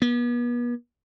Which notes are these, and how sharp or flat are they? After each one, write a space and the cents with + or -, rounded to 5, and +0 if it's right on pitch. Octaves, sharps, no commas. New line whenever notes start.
B3 -40